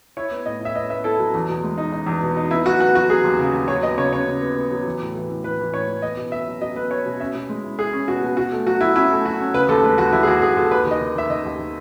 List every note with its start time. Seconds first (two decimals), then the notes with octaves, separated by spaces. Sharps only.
0.17 E4 C#5
0.31 B3
0.46 A2 D#5
0.61 E4 E5
0.75 B3 D#5
0.90 B3 E5
1.04 E4 A4
1.19 F#3
1.34 E2
1.49 B2
1.63 G#3
1.78 D#4
1.92 D#4
2.07 E2
2.22 B2
2.37 D#4
2.51 B3 E4
2.66 F#3 F#4
2.80 B3 F#4
2.95 F#3 F#4
3.10 F#3 G#4
3.24 D#2
3.39 C#3
3.54 D#2
3.68 F#3 C#5
3.83 B3 D#5
3.97 C#3 C#5
4.12 C#3 C#5
4.27 C#3
4.41 B3
4.56 B3
4.71 F#3
4.85 E3
5.00 A2
5.15 E3
5.30 A2
5.44 E3 B4
5.59 E3
5.73 A2 C#5
5.88 E3
6.02 B3 D#5
6.17 B2
6.32 B3 E5
6.47 F#3
6.61 F#3 D#5
6.76 B3 B4
6.90 B3 C#5
7.06 B2
7.20 C#4 E5
7.35 B2
7.49 G#3
7.64 E4
7.79 E4 G#4
7.93 C#4
8.08 B2 F#4
8.22 B2
8.37 B2 F#4
8.52 A3
8.66 F#3 F#4
8.81 F#3 E4
8.95 C#4 E4
9.11 A3
9.25 F#3 F#4
9.40 C#4
9.54 C#3 B4
9.69 D#2 A4
9.84 G#3 B4
9.98 D#2 F#4
10.13 D#2 E4
10.23 G#4
10.27 D#2 F#4
10.42 D#2 G#4
10.57 D#2 A4
10.71 D#2 B4
10.86 D#3 D#5
11.01 D#3
11.15 D#3 E5
11.30 D#3 D#5
11.45 D#2
11.59 D#3